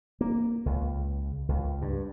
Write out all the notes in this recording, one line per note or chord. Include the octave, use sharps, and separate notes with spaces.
A#3
C#2
C#2
G2